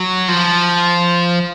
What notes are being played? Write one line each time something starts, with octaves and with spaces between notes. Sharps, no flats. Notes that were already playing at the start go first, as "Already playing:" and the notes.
Already playing: F#3
F3